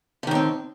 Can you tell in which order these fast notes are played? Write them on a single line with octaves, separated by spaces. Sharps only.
D3 D#3 A2 C4